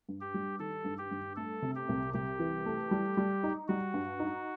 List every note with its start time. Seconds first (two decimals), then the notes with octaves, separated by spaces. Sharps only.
0.08 G2
0.21 G4
0.34 G3
0.59 D#3 A4
0.85 G2
0.98 G4
1.11 G2
1.36 A3 A4
1.62 C3
1.76 G4
1.89 C2
2.14 C2 G4
2.39 E3
2.66 A3
2.91 G3
3.17 G3
3.43 D#4
3.68 G3 F#4
3.94 G2
4.19 D#4